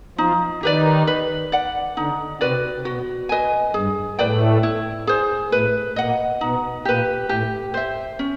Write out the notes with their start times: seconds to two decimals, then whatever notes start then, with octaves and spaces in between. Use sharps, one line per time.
0.18 F3 D#4 F4
0.63 D#3 D#4 G4 B4 D5
1.07 B4
1.52 D5 F#5
1.96 D3 D4 D#4
2.40 C3 C4 F#4 B4 D5
2.85 B2 B3 F#4
3.29 B4 D#5 G#5
3.74 G2 G3 G#4
4.18 A2 A3 B4 D5 G5
4.63 E4
5.07 G#4 C5
5.52 A2 A3 B4
5.96 A#2 A#3 D#5 F#5
6.41 B2 B3 D#4
6.85 A#2 A#3 G4 B4
7.29 A2 A3 G4
7.74 C5 E5
8.19 C#4